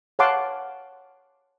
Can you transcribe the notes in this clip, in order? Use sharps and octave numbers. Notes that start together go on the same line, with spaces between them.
C#5 F5 F#5 A5 C6 D6